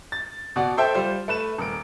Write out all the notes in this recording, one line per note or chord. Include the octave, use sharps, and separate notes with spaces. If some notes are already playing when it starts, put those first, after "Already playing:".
A6
B2 F#4 D5
A4 C5 E5 G5
G3 F4 C5
A3 B4 E7
D#1 A#4 D7